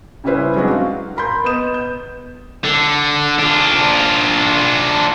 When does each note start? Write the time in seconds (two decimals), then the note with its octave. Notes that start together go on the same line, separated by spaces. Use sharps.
0.24 C#3 G3 C#4 E4 B4 C5
0.56 F#3 G#3 C4 D4 F#4
0.71 F5
1.17 A#4 B5 C6 G6
1.44 B3 D#5 D#6 E7
1.74 G6
2.64 D3
3.39 D4 F4